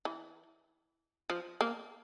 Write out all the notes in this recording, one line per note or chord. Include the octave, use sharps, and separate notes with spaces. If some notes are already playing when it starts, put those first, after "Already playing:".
E3
F3
A#3